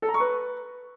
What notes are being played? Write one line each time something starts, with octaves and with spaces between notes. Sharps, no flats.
A4
A#5
C#6
B4